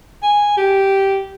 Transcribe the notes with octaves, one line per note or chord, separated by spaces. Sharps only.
G#5
G4